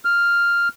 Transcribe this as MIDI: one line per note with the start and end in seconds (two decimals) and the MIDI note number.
0.05 0.68 89